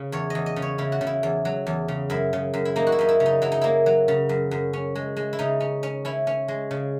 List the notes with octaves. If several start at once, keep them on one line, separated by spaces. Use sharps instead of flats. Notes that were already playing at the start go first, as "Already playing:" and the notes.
Already playing: C#3
E2 C#5
E2 D#5
D#5
C#3
C#5
C#3 E4
F#4
C#3
E4
E2
F#3
E2
C#3
F#2 E4
C#3
F#2
E4
A#3 D#4
F#4
E4
F#2 D#4
E4
C#3
D#4
F#3 E4
D#4
A#3 E4
F#3
C#3
F#2
F#2
C#4
G#3
G#3
E4
C#3 D#4
C#4
C#4
C#4 E4
C#4
G#3
C#3